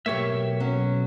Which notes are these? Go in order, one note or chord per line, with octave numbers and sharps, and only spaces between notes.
B1 A#3 G4 C#5 E5
F#3 C#4